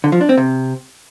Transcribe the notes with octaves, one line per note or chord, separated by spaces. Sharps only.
D3
F3
D4
C4
C3